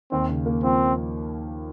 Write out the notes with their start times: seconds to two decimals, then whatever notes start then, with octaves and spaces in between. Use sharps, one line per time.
0.12 D#2 C4
0.29 C#3
0.46 A#3
0.63 F3 C4